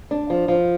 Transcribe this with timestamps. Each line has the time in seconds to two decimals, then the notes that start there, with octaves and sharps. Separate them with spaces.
0.11 D4
0.30 F3
0.48 F3